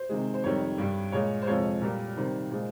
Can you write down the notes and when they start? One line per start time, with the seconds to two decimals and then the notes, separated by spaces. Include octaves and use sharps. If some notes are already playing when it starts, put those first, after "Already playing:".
Already playing: C5
0.09 C3 D#3 G#3
0.34 C5
0.44 F2 C3 D#3 G3 C#5
0.78 G2 G3
1.12 A#2 G#3 C#5
1.42 C5
1.47 F2 C3 F3 G#3 C#5
1.81 A#2 G3 A#4
2.17 C3 D#3 G3 C5
2.51 A#2 G#3 C5